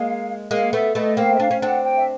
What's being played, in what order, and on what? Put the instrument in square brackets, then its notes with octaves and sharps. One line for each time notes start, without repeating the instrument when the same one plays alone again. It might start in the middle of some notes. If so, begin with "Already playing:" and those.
Already playing: [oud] G#3 A#3 [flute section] F5
[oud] G#3 A#3 [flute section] F5
[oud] A3 B3 [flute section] E5
[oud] A3 B3 [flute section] D#5
[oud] A#3 C4 [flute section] F5
[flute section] E5
[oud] D4 [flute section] F5
[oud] C#4
[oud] C4 D4 [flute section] F#5
[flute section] G5
E5